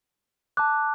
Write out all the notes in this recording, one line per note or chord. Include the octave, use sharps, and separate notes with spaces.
A5 D6 F#6